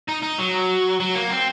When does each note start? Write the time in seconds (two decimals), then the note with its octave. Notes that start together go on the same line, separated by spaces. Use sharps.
0.09 D#4
0.23 D#4
0.39 F#3
1.00 F#3
1.15 A#3
1.30 C4